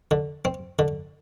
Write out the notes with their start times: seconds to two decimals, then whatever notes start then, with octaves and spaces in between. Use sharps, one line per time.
0.11 D3
0.45 C4
0.79 D3